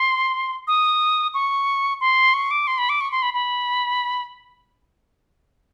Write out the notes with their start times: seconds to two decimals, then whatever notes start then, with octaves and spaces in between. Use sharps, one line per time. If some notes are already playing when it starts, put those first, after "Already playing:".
Already playing: C6
0.68 D#6
1.34 C#6
2.01 C6
2.34 C#6
2.51 D6
2.67 C6
2.78 B5
2.89 D6
3.01 C#6
3.12 C6
3.22 B5
3.34 B5